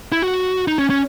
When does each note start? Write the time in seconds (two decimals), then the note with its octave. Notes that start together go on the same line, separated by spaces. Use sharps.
0.12 E4
0.22 F#4
0.67 D#4
0.78 C#4
0.90 C#4